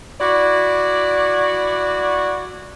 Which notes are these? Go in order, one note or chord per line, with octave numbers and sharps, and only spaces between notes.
E4 F#4 D5